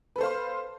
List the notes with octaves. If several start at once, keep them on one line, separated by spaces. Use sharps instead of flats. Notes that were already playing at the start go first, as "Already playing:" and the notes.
A4 B4 C5 F5 C6